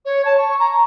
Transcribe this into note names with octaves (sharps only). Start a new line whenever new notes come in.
C#5
A5
C#6
A#5